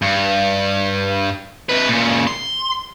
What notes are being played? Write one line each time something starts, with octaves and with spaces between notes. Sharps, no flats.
G2
C3 B4
A#2 C#3
C6